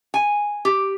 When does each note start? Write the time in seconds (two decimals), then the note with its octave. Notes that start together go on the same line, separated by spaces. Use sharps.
0.14 G#5
0.65 G4